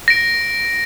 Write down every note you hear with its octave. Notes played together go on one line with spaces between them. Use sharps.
A#6 D7